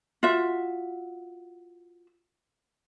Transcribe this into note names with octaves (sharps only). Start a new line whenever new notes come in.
F4 F#4 E5